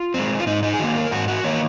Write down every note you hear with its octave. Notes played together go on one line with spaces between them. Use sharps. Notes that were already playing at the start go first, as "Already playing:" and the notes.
Already playing: F4
G#3 C4
F4
G#2 D#4
D#4
G#4
D#3 A#3 F#4
A#4
G#2 F#4
F#4
D#3 A#3 C#5